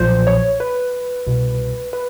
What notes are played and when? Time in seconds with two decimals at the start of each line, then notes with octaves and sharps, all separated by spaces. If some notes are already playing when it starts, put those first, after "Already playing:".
Already playing: B1 A#2 F3 C5
0.27 C#5
0.60 B4
1.27 C2 B2
1.93 B4